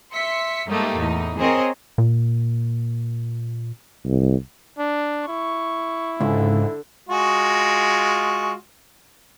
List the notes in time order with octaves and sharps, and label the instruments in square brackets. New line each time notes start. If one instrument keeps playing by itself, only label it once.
[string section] E5 C6 B6 C#7
G#2 G3 A3 A#3 D#4 G4
E2 A2 D#4
C4 G#4 A#4 C5 C#5 D#5
[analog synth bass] A#2
[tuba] C2
[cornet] D4
[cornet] E4 [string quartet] C#6
[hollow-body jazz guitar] C#2 [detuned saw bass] G#2 [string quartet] D3
[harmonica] G#3 F4 F#4